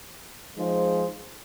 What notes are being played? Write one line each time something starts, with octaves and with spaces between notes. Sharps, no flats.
F3 G#3 D#4 G#4 C5